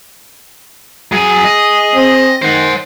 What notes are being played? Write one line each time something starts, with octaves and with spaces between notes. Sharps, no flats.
F#3 G#4 G#5
D#5
C4
D#3 C5 F#5